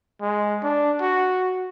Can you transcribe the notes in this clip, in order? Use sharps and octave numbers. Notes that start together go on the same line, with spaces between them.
G#3
D4
F#4